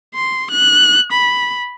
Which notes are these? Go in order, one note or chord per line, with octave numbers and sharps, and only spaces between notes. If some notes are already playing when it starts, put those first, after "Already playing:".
C6
F#6
B5